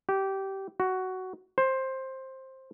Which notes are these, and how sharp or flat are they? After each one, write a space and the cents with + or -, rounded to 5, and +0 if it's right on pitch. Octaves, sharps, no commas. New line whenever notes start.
G4 -20
F#4 +10
C5 +15